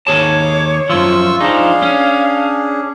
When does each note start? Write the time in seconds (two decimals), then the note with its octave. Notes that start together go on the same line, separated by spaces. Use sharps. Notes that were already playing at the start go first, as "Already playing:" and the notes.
0.07 D#2 G#4 C#5 A5 D6
0.90 F#2 F3 F4 C#6 E6
1.40 F3 D4 D#4 G#4 F5
1.82 C#4